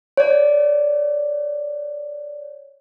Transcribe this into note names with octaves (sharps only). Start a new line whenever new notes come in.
C#5 D5